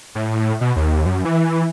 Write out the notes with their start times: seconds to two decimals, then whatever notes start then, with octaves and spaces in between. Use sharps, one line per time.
0.15 A2
0.61 B2
0.76 D#2
1.06 F#2
1.25 E3